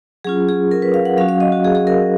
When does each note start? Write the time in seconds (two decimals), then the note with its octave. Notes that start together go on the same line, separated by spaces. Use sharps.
0.24 F#3 C#4 F4 G#4
0.49 G#4
0.71 A#4
0.82 B4
0.94 F5
1.05 F#5
1.17 F#3 C#4 F#4 F5
1.29 F5
1.40 D#5
1.52 F#4
1.64 G#4
1.75 G#4
1.87 A#4